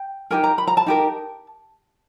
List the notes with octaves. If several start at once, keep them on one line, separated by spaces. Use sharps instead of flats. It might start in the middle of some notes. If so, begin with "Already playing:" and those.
Already playing: G5
D#4 G4 A#4 G#5
A#5
B5
A#5
A5
D#4 G4 A#4